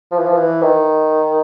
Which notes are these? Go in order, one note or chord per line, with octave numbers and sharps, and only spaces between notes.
F3
E3
F3
E3
D#3